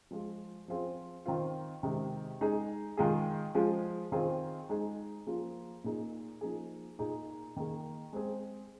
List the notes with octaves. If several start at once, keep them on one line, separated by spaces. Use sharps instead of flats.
F3 G#3 F4 G#4
F3 C4 F4 G#4
D#3 C4 F4
C3 D#3 G#3
G#3 D#4 G#4
D#3 G#3 F4 G#4
F3 G#3 F4 G#4
D#3 C4 F4 G#4
G#3 D#4 G#4
F3 A#3 F4 G#4
A#2 A#3 D#4 G#4
F3 A#3 D#4 G#4
A#2 A#3 D#4 G#4
D#3 A#3 G#4
G#3 C4 G#4